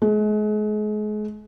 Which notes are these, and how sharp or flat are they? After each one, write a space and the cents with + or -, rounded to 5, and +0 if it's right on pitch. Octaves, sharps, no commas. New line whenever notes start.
G#3 +35